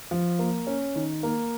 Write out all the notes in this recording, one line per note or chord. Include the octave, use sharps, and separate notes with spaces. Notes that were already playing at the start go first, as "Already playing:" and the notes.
F3
A#3
C#4
D#3
A#3